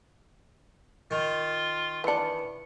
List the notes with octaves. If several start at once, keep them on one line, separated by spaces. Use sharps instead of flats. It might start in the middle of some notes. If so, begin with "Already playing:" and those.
D#3 F4
E3 D4 B4 C#7